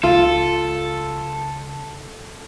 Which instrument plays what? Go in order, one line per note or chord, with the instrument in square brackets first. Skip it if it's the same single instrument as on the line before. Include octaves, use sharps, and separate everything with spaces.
[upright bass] C#2 [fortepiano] F4 [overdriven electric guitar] A4